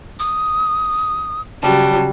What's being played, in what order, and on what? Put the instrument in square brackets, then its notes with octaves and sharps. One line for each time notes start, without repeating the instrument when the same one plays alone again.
[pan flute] D#6
[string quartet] C#3 F#3 G3 [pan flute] A5